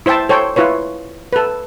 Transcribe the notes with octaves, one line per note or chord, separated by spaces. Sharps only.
E4 C5 E5 G5 A5
A4 C5 C#5 G5
E4 F4 B4 C#5
A4 B4